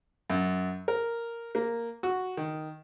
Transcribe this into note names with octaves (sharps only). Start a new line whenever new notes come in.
F#2
A#4
A#3
F#4
D#3